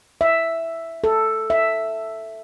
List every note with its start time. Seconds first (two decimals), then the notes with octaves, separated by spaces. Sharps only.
0.21 E5
1.04 A4
1.50 E5